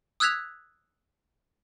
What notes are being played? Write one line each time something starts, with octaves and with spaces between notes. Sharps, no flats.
D#6 E6 F#6 G#6 B6 F7